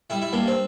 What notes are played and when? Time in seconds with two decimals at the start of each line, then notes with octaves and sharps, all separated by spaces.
0.10 G3 E4
0.22 E4
0.33 G2 A#3
0.47 C4